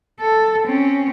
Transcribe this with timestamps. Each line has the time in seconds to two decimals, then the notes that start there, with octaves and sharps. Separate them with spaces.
0.20 A4
0.65 C4 C#4